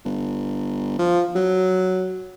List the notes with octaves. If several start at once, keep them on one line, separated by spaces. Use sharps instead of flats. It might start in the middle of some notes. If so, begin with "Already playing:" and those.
G1
F3
F#3